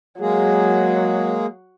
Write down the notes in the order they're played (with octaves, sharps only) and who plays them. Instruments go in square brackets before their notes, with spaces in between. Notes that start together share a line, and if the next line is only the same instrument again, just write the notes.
[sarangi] F#3 [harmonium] G#3 A#3 G#4